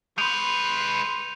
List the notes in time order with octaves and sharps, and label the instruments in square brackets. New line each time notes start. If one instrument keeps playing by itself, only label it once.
[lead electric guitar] G#3 B4 [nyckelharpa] C6 C#6 [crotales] G6 D#7 F7